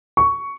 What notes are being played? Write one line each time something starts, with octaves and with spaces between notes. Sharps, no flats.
C#6